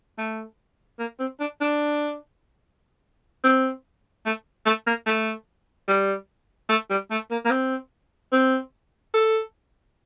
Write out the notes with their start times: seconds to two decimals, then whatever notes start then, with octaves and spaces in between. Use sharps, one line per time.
0.18 A3
0.99 A#3
1.20 C4
1.40 D4
1.61 D4
3.44 C4
4.26 A3
4.66 A3
4.87 A#3
5.06 A3
5.88 G3
6.69 A3
6.90 G3
7.11 A3
7.31 A#3
7.45 A#3
7.51 C4
8.32 C4
9.14 A4